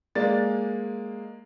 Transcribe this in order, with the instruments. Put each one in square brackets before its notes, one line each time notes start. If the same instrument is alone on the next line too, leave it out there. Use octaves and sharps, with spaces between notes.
[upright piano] G#3 A#3 D5 A6